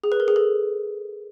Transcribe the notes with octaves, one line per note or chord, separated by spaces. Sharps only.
G#4
B4
A#4
G#4
A4